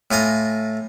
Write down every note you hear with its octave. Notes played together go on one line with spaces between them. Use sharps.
A2 F4 G#5 A#5